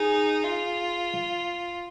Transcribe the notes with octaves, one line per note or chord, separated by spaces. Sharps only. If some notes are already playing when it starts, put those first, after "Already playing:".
Already playing: D#4 G#4
F4